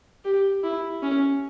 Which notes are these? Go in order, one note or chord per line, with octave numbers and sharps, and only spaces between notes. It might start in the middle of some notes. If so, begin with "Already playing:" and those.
G4
E4
C#4